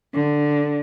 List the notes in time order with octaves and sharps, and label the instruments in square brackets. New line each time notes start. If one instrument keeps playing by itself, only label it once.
[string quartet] D3